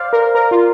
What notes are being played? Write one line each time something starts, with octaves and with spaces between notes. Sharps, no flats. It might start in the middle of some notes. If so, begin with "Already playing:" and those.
Already playing: C5 D5 F5
A#4
A#4
F4